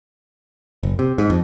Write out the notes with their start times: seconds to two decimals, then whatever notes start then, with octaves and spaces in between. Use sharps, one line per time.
0.83 F#1
0.99 C3
1.18 G#2
1.30 F2